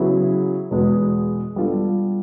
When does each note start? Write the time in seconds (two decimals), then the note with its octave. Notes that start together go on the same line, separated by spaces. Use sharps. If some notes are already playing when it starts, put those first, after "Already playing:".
Already playing: C#3 F#3 B3 E4 G#4
0.71 E2 B2 G#3 B3
1.56 G3 B3 D4 F4 A4